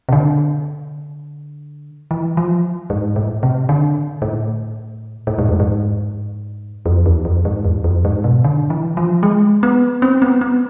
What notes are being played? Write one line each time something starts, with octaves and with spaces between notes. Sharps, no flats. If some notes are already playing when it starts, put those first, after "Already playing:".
C3
D3
E3
F3
G#2
A2
C3
D3
A2
A2
G#2
F2
G#2
F2
E2
F2
G#2
E2
F2
G#2
B2
D3
E3
F3
G#3
B3
C4
B3
B3